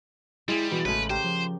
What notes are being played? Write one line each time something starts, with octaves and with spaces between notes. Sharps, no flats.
G3 G#3 E4 G#4
B2 E3
A1 C#3 G#3 A3 B4
G4 A#4 C5
F3